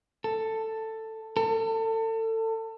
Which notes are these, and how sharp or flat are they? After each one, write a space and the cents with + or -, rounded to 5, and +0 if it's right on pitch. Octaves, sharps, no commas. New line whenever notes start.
A4 +10
A4 +30